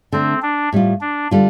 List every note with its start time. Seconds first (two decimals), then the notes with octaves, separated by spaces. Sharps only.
0.12 D3 A3 C4 D4
0.42 D4
0.72 A2 G3 F4
1.01 D4
1.31 D3 G3 F4